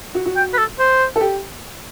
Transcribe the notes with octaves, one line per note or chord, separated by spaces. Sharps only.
F#4
F#4
G5
B4
A4
C5
A4
G4